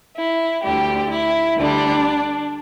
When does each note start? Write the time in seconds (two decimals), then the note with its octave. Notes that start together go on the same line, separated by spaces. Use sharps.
0.15 E4
0.62 D2 D3 G3 G4
1.10 E4
1.57 D2 D3 G3 D4